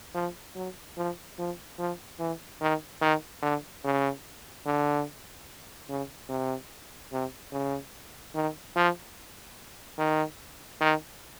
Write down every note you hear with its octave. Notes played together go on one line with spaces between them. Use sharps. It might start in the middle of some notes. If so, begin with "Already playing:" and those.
F3
F#3
F3
F3
F3
E3
D#3
D#3
D3
C#3
D3
C#3
C3
C3
C#3
D#3
F3
D#3
D#3